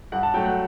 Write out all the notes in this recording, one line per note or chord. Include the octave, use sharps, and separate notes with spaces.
G2 F#5
A5
F#3 A3 G5
F#5